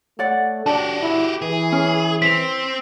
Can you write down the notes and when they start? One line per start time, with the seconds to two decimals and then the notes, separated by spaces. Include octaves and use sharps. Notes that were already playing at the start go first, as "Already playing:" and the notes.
0.19 A3 C#5 D5 F#5
0.66 D4 F#4 G4 A5
1.02 E4
1.42 E3 G#4
1.72 C#4
2.22 C4 B6 F7